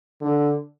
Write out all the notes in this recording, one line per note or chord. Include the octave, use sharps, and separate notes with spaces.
D3